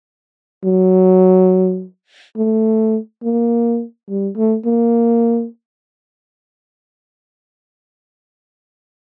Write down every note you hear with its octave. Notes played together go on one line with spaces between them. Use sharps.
F#3
A3
A#3
G3
A3
A#3